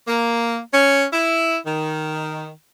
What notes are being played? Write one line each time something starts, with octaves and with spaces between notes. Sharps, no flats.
A#3
C#4
E4
D#3